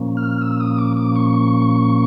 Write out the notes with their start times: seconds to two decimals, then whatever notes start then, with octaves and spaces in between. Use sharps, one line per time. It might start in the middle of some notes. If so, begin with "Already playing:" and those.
Already playing: A#2 F3 A#3 C#4
0.17 F6
0.42 E6
0.60 D#6
0.78 D6
0.97 D6
1.15 C#6